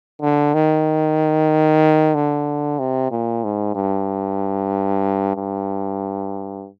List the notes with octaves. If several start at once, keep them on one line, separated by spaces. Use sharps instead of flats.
D3
D#3
D3
C3
A#2
G#2
G2
G2